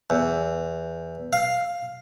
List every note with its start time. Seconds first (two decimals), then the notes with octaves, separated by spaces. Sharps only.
0.10 E2
1.33 F5